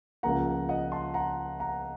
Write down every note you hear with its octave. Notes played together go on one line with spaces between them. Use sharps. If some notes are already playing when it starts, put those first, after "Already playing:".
C#2 C#3 F3 A#3 F#5 A#5
D#5 F#5
A5 C6
F#5 A#5
F#5 A#5